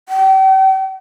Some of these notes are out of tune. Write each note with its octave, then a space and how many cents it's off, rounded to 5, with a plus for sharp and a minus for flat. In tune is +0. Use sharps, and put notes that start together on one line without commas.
G5 -35